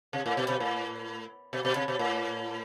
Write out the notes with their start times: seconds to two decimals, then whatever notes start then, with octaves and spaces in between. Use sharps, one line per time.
0.13 C3
0.26 A2
0.37 B2
0.49 B2
0.60 A2
1.53 B2
1.65 B2
1.76 C3
1.88 B2
1.99 A2